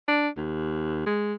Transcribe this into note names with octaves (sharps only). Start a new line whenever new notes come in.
D4
D#2
G#3